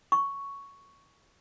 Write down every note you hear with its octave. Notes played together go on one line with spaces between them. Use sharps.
C#6